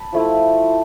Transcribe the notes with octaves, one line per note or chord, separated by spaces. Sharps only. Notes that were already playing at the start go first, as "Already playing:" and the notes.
Already playing: A5 B5
F3 A3 E4